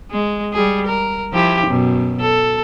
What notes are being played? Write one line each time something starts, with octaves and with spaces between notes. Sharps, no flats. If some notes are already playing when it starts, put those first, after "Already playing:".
G#3
G3 G#4
A#4
F3 E4 G4
F#2 B2
A4